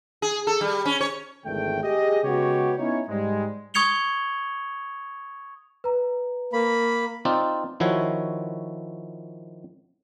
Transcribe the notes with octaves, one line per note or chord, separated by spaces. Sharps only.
G#4
A4
G3
C#4
C#5
G#1 E2 D3 A3 G5
G4 G#4 D#5
C#3 G#3 B3 F#4 G4 C#5
B3 C#4 D#4 E4 C#5
G#2 G3 G#3
C#6 D#6 G#6 C#7 F7 G7
B4 A#5
A#3 B5
C4 D#4 F4 D5
D#3 F3 E4 F#4 C#5